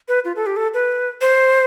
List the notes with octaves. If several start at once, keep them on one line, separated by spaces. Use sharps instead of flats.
B4
F4
A4
G4
A4
B4
C5